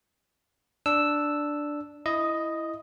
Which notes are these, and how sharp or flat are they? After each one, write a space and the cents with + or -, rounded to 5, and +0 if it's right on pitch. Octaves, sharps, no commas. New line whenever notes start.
D4 +0 E6 +0
E4 +5 D#5 +0 D#6 +25